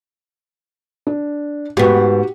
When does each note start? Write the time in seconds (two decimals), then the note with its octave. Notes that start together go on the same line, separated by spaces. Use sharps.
1.07 D4
1.77 G#2 B3 F#4 G4